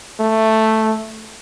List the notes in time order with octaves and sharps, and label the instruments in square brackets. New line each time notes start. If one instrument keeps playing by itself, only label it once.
[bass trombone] A3